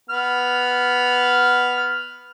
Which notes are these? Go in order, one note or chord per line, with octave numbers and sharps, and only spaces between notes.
B3 F6